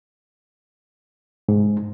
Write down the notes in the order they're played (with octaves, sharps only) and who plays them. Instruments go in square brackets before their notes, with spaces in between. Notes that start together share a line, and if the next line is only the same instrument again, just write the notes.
[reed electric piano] G#2